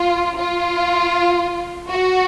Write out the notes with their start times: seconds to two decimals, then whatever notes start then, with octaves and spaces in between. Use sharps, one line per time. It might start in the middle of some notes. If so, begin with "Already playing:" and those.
Already playing: F4
0.37 F4
1.88 F#4